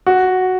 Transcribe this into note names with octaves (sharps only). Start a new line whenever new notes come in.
F#4